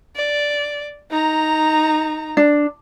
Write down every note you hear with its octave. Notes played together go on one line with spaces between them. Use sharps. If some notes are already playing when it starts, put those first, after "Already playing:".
D5
D#4 A#5
D4